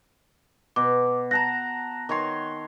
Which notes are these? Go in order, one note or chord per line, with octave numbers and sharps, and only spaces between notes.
B2 D6
F#5 A5 A#5 A#6
D#3 C#5 C6